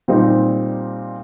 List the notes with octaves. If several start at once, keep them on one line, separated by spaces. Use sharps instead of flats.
A#2 G3 C4 D#4